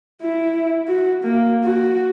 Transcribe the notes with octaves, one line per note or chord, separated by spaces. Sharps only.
E4
F#4
A#3
F#4